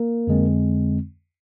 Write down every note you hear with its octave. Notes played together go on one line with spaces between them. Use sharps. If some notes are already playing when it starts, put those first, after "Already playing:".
Already playing: A#3 A#4
F2 D3 G#3 C4